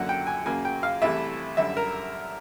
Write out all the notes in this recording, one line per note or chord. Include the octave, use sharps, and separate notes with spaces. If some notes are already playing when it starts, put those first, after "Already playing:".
Already playing: F#2 D3 F#3 A#3 F#5
G5
G#5
F#2 C#3 F#3 A#3 G#5
G5
F5
C2 C3 E3 A3 E5
F#2 D3 G3 E5
A#4